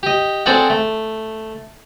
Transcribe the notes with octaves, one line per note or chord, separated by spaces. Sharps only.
G4 D#5
C4 G#4 A4 D5 F#5 G5
A3